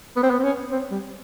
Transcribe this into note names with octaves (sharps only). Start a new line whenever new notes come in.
B3
C4
B3
C4
C#4
C4
G3